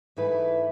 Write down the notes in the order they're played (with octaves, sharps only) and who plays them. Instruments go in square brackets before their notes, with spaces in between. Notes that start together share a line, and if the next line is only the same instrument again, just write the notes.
[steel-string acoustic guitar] G#2 E3 A3 E4 B4